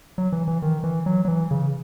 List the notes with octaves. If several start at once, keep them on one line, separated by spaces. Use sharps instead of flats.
F#3
E3
E3
D#3
E3
F#3
F#3
E3
C#3